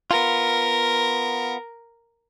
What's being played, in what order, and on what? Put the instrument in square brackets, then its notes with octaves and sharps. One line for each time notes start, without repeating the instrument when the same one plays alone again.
[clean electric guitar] B3 F4 [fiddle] A#4